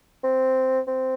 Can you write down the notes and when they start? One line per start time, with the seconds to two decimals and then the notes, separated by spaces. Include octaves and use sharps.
0.24 C4
0.87 C4